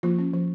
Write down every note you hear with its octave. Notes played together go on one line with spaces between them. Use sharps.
F3 A#3 F4
C#4
F3